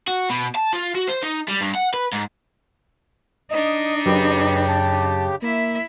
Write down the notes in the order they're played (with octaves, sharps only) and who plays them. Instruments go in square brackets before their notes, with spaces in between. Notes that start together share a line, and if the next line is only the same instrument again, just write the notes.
[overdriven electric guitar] F#4
B2
A5
F4
F#4
C5
D#4
G3
G2
F#5
B4
G#2
[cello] D4 D#4 [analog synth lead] D#5
[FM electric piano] F#2 [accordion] C#3 G4 [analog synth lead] B4
[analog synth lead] A5
[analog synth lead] A#3 [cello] E4 E5